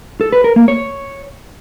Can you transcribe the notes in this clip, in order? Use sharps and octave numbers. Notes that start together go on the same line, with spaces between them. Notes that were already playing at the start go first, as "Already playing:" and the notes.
A4
B4
A#4
A#3
C#5